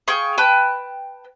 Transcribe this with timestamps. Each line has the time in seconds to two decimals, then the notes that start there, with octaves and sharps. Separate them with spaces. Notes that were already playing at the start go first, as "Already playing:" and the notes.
0.08 G#4 F5 G5 C#6
0.38 B4 G5 A5